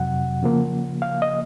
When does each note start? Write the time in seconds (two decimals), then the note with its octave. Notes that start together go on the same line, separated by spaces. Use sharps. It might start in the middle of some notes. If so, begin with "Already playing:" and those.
Already playing: F2 C3 F#3 F#5
0.43 C#3 F3 A#3
1.02 F5
1.22 D#5